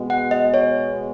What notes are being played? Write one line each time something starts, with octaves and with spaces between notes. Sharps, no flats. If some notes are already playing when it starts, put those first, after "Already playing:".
Already playing: B2 G#3 B3 F#4
F#5
D#5
C#5